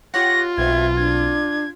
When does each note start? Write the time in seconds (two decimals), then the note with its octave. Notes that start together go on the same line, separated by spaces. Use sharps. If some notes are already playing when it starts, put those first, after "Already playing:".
0.14 F4 G4 C#5 F#5 A#6
0.57 B1 B2 C4 E5 G#6
0.97 D4 G#6